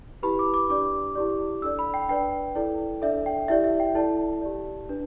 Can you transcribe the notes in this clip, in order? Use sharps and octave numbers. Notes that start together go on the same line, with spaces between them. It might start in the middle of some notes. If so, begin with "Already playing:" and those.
E4 G4 B4 B5
D6
D6
D4 G4 D5 D6
E4 G4 D5
D4 A4 D5 E6
B5
G5
D4 B4 D5 G5
E4 A4 D5
D4 A4 D5 E5
G5
E4 G4 D5 E5
E5
G5
E4 A4 D5 A5
G4 D5
D4 B4